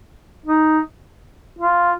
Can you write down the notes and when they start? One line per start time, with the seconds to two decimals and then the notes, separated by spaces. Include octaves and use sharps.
0.46 D#4
1.59 F4